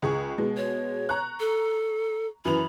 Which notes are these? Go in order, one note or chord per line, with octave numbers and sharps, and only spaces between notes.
C#2 G#4 C#6
B2 G#3
C#5
A#5 C#6 F#6
A4
F#2 E3 B5 F7